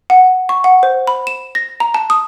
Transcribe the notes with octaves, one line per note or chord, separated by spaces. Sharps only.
F#5
C#6
F#5
C5
B5
E7
A#6
A#5
A5
D#6